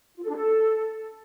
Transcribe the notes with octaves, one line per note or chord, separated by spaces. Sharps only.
F4
A4
D4
A4